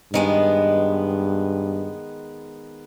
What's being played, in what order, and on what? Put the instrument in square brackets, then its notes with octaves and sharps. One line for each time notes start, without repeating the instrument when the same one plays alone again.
[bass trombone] G2 [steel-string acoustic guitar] D#3 G#3 B3